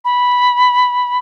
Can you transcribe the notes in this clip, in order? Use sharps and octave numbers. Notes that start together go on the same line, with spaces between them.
B5